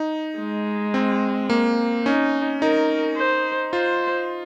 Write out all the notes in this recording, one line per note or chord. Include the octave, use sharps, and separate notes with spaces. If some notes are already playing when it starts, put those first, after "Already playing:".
Already playing: D#4
G#3
C4
A#3
C#4 D#4
D#4 A#4
C5
F4 C5